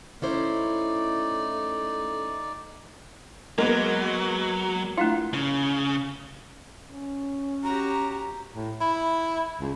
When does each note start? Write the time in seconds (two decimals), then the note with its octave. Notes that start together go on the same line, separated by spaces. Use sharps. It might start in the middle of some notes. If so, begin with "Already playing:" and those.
0.22 A3 C#4 D#4 E4 C5 D5
3.58 F#3 G#3 A#3 B3 A#4
4.98 A3 D4 E4 F4
5.34 C#3
6.91 C#4
7.64 F#4 G4 A#5
8.54 A2
8.81 E4
9.60 C#2